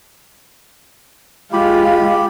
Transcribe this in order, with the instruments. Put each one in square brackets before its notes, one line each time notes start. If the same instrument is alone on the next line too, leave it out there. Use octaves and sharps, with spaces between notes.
[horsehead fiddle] G#3 F4 [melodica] G4 B5